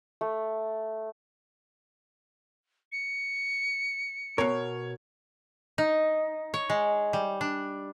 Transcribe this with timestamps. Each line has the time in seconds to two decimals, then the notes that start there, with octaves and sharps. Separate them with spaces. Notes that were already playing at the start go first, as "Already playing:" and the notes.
0.21 A3
2.92 C#7
4.38 B2 A#4 C#5
5.78 D#4
6.54 C#5
6.70 G#3
7.13 G3
7.41 D4